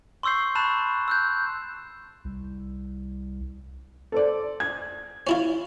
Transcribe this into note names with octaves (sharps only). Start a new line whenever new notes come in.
C6 C#6 E6 G6 C7
A5 B5 C#6 F#6 A6 E7
E6 F#6 G6
C2
A4 C5 D5
G#6
C#4 E4 F4